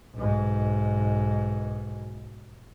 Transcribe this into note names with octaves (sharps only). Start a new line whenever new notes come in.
B1 G#2